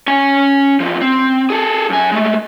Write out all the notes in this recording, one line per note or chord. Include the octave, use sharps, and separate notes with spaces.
C#4 G#5
E2 F3
C4
G#4 A4
F#2 G#5
G#3 A3